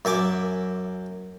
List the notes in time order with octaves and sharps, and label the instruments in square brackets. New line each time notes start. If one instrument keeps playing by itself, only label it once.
[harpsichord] F#2 E5 G#5 D6